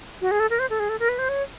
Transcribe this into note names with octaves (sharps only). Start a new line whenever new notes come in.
F#4
G#4
A4
A#4
C5
A4
G#4
A4
A#4
B4
C5
C#5